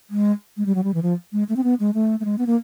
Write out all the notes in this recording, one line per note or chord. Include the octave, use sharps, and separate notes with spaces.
G#3
G#3
G3
F#3
G3
E3
F3
G#3
A3
C4
B3
G#3
A3
A3
G#3
B3
A#3